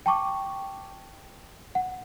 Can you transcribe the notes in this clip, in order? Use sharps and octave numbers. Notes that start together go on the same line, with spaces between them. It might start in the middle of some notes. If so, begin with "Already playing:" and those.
G5 A5 C#6 D6
F#5